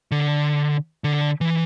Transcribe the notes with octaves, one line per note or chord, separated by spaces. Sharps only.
D3
D3
E3